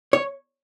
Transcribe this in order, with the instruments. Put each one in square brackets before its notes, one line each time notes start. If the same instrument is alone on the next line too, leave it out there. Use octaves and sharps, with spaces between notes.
[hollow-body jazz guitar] C#5